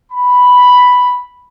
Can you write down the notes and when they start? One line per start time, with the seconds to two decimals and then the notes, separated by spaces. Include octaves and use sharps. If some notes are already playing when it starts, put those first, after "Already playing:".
0.12 B5